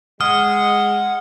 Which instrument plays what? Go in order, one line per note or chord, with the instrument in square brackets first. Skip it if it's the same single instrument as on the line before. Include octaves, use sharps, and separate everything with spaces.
[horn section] G#3 [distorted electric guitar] F#5 [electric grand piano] D#6 [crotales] F6